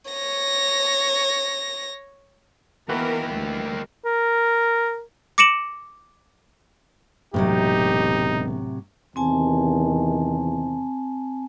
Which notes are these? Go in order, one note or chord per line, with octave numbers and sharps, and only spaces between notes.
C#5 A#6
E3 A#3 B3 F#4 G4 A#4 B4
D2 G3
A#4
D6 A#6 C#7 D7 E7 F#7
E1 A2 C3 F#3 D#4 G4
E2 C3 D#3 C4 G#5 A5